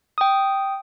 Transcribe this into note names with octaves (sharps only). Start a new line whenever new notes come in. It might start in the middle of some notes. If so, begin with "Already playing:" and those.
G5 D#6